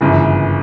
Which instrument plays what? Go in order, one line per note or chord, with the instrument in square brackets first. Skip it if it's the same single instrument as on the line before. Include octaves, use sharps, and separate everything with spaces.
[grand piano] G1 F#2 C#3 E3